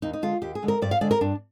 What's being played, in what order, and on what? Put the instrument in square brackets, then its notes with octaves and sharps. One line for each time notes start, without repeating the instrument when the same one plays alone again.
[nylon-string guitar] D#2 D#4
D#4
D3 G#3 F4
D#2 G4
G#4
D3 G#3
A#4
G2 D5
F5
D3 G#3 D5
A#4
G2 D4